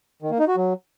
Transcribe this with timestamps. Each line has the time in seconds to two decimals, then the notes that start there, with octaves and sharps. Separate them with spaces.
0.22 D#3
0.31 A#3
0.39 D#4
0.48 F#4
0.57 F#3